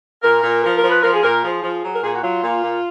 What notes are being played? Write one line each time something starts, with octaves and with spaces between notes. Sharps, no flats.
A#2 A#4
A#2
F3 A#4
A#4
F3
B4
F3 A#4
G#4
A#2 A#4
F3 G#4
F3
F#3
A#4
A#2 G#4
F#4
F#3 F4
A#2
A#2